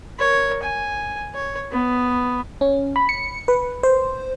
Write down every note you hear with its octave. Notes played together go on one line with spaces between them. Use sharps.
A#4 C#5
G#5
C#5
B3
C#4
B5
C#7
B4
C5